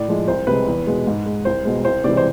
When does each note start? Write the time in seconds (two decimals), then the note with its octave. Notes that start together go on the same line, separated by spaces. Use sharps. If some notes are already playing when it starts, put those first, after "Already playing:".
Already playing: A2 D5
0.08 F3 G#3
0.28 C2 C5
0.47 C3 G#3 B4
0.67 E2
0.87 B2 G#3
1.07 G#2
1.26 G#3
1.45 C2 C5
1.65 B2 G#3
1.85 C2 C5
2.04 C3 E3 G#3 D5
2.17 C5